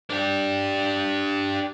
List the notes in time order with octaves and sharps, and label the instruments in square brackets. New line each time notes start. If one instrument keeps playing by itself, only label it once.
[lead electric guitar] D4 G4